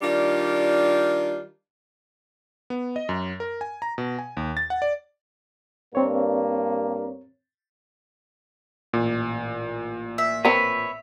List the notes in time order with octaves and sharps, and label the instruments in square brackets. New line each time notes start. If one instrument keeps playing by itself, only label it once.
[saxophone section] D#3 G3 D4 F4
[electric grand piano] B3
D#5
F#2
A#4
G#5
A#5
B2
G#5
D#2
A6
F#5
D5
[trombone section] G2 A#3 [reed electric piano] C4 C#5
[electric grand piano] A1 A#2
[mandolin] E5
[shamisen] C4 A#4 [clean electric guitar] B4 C#5